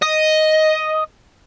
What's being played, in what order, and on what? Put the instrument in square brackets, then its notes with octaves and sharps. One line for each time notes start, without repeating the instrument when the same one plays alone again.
[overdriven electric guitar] D#5